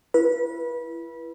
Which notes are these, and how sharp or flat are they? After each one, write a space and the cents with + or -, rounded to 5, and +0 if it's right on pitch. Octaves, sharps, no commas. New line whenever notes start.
E4 +30 B4 -25